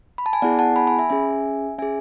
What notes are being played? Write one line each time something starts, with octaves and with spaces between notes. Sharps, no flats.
B5
A5
G#5
B3 E4 G#4 D5 F#5
F#5 A5
G#5 B5
G#5 B5
E5 G#5
C#4 G#4 E5 G#5
C#4 G#4 E5 G#5